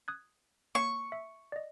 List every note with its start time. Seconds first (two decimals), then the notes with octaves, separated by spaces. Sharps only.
0.08 D#6 F#6 G#6
0.75 A#3 C#5 C#6 C7
1.12 E5
1.52 D5 D#5